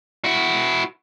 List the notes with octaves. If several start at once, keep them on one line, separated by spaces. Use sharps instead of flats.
E4 F#4